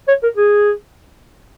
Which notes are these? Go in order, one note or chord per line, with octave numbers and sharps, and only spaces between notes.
C#5
A#4
G#4